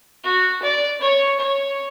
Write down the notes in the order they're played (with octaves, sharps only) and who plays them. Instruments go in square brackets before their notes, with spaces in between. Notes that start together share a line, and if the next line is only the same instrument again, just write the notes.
[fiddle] F#4
D5
C#5
C#5